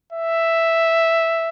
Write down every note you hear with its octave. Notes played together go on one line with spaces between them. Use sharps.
E5